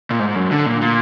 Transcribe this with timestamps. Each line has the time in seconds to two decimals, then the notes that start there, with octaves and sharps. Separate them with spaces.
0.11 A#2
0.19 G#2
0.35 F#2
0.51 D3
0.66 A#2
0.82 A#2